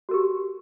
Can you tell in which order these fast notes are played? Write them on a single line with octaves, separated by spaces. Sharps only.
F#4 A#4 G4